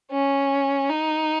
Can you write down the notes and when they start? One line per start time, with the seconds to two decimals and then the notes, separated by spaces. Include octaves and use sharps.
0.11 C#4
0.89 D#4